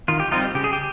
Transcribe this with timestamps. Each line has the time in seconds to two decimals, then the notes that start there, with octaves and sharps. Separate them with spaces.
0.08 D#3 F4
0.20 G4
0.31 G3 C4 D#4 F4
0.43 G4
0.55 C#3 G4
0.64 G#4
0.73 G4